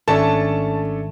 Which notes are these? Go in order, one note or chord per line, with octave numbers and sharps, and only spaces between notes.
G#1 A3 C#4 D4 A4 A5